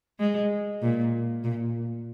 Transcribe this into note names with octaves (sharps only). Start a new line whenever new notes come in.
G#3
A#2
A#2